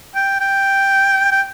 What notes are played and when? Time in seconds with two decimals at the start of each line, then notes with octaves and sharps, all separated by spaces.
0.15 G5
0.41 G5
1.32 G5